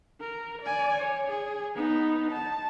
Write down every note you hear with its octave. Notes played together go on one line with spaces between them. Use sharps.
A#4
D5 G#5
C#5
G#4
B3 D#4
A5